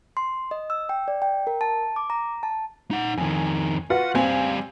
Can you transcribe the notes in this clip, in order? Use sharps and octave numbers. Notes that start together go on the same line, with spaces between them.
C6
D#5
E6
G5
D5
G5
A#4
A5
D6
A#5
A5
D#4 F#5
F2 D#3 G#5
F4 F#4 B4 F#5
G3 C4 F5 G#5